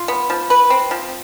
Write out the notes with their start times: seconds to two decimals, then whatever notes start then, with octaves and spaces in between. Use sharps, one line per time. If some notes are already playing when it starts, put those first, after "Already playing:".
Already playing: F4
0.08 B3
0.30 F3
0.50 B4
0.70 C4
0.91 F3